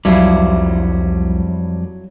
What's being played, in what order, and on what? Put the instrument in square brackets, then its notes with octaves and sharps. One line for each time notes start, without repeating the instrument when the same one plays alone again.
[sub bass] C2 [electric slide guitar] F2 G3 [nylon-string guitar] F#3 E4 F4